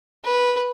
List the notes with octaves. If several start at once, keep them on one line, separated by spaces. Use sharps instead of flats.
B4